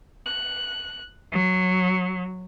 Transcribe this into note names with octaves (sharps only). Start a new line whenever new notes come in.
F#6
F#3